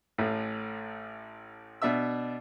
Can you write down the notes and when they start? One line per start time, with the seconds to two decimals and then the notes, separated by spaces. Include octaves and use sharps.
0.18 A1 A2
1.82 B2 D4 E5 E6